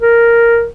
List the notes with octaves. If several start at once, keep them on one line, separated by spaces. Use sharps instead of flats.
A#4